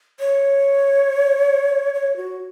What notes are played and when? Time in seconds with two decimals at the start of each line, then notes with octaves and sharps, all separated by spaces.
0.20 C#5
1.94 C#5
2.17 F#4